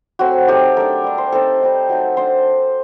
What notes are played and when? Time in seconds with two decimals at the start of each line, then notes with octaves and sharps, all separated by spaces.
0.19 F#3 A3 C4 F#4
0.48 F#3 A3 D#4 G4
0.77 A3 D4 A#4
1.04 G3 D4
1.18 C5
1.32 A3 C4 D#4 A4
1.61 G3 C4 D#4
1.89 F#3 A3 D#4
2.17 A3 D4 C5